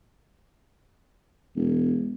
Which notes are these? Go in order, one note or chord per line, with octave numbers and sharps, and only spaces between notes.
E1